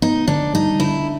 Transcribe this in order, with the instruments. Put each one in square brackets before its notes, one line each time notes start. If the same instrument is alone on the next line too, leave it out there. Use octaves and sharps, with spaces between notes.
[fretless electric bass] B3 [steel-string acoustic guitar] D#4
[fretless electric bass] D3 [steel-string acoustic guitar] D4
[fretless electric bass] G3 [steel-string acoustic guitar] D#4
[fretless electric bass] D3 [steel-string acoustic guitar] E4